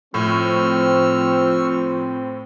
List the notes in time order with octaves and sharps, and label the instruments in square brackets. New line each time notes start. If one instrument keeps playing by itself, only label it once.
[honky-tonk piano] A2 [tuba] F3 [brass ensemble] C4 [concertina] C#6 E6 F6